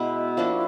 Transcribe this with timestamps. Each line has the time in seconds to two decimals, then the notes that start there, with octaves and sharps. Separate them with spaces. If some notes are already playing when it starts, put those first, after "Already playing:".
Already playing: B2 G#3 B3 E4
0.37 F3 A#3 D4 F#4